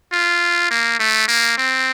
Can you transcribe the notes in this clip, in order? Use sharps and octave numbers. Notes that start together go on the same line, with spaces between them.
F4
A#3
A3
A#3
C4